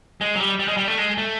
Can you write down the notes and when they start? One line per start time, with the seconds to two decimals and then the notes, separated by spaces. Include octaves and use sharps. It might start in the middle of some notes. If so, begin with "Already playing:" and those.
0.21 G#3
0.35 F#3
0.40 G3
0.59 G3
0.68 G#3
0.77 G3
0.88 A3
0.98 G#3
1.18 A3